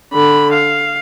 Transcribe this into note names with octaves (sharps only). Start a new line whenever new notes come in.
D3 B5
F5